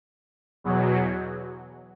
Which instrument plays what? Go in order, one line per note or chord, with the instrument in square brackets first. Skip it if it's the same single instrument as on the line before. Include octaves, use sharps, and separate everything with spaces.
[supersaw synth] E2 B2 F#3